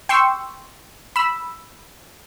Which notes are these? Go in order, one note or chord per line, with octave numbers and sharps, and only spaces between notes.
G5 C6 C#6 E6
B5 E6